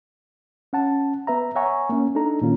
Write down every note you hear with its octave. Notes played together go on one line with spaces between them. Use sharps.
C#4 F#5 A5
B3 B4 E5 A#5
C#5 E5 F#5 G#5 A#5 C#6
A#3 C#4
D4 D#4 A4 A#5
A#2 D#3 A#3 C#4 F4